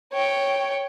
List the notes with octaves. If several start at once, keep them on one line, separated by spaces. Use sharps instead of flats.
C#5 G5